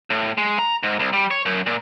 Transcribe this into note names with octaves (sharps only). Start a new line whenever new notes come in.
A2
G#3
A#5
G#2
C2
G3
C#5
F#2
A#2